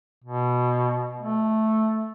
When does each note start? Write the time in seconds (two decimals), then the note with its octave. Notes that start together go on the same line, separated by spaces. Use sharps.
0.24 B2
1.21 A3